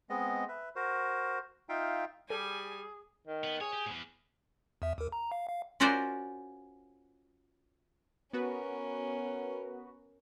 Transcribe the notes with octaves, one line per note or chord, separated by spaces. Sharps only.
G#3 B3 C4 D#5
B4 E5
F#4 A#4 C5
D#4 F4 E5 F5 G5
G3 G#4 A4 G#5
D#3
B3
G#4 C#5
G4
E2 G#2
E2 E5
D#2 A#4
A#5
F5
F5
C#4 F4 F#4 A#4 C5 D5
B3 C#4 F#4 A#4 B4